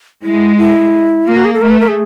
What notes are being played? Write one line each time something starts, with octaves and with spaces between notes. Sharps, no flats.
G#3 E4
E4
A#3 F4
F#4
G#4
A4
A3 A#4
B4
A#4
G#4